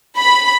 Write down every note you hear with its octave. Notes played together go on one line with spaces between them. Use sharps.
B5